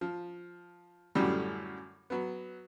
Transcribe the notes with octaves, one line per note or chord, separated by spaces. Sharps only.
F3
F#2 A2 D3 F#3 G3
F#3 B3